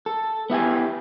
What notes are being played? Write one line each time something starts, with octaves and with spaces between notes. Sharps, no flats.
A4
B3 E4 G4 G#5